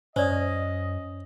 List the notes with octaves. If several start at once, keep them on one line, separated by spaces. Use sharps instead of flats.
F#2 C#4 C5 D5 D#5 D#6